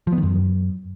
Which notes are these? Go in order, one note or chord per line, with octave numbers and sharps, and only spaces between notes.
F3
B3
D#3
F#2